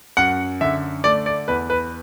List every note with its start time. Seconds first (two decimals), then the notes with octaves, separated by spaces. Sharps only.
0.17 F#2 F#5
0.61 D3 E5
1.04 A3 D5
1.26 D5
1.48 E2 B4
1.70 B4